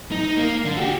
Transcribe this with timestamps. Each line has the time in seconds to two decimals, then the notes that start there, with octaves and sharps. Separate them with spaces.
0.12 D#4
0.37 A#3
0.65 D3
0.77 F#4 G4